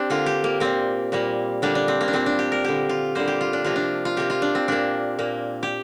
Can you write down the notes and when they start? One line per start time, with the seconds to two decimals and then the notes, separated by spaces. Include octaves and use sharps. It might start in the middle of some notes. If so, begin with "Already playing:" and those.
Already playing: C4 D4 G4
0.10 D3 A#3 F4
0.26 G4
0.44 A#3
0.60 A#2 A#3 C4
1.12 A#2 G3 A#3
1.62 D3 G3 A#3 D4
1.75 D4
1.88 C4
2.01 A#3
2.08 D4
2.13 A#2 A#3 C4
2.26 D4
2.39 G4
2.52 A#4
2.64 D3 A#3 G4
2.89 F4
3.15 D3 G3 A#3 C5
3.28 G4
3.41 F4
3.53 D4
3.64 C3 F3 A#3 F4
3.76 D4
4.05 F4
4.17 C3 A#3 G4
4.30 F4
4.42 D4
4.55 C4
4.68 A#2 A#3 D4
5.19 A#2 A#3
5.63 G4